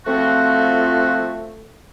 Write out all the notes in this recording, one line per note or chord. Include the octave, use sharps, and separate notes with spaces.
F3 A3 C4 F#4